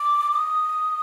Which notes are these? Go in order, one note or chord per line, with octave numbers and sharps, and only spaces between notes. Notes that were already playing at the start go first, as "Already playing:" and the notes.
Already playing: D6
D#6